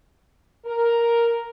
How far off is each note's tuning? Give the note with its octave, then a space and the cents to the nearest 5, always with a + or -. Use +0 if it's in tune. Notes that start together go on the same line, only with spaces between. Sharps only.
A#4 +5